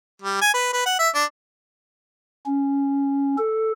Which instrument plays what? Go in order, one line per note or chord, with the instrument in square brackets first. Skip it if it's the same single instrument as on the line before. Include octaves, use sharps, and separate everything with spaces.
[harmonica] G3
G#5
B4
B4
F#5
E5
D4
[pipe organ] C#4
A4